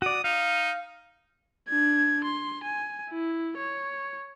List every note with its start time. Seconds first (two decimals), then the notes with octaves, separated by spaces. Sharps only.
0.02 F#4 D5 D#6
0.24 D#4 F5
1.69 D4 G#6
2.24 C6
2.64 G#5
3.10 E4
3.58 C#5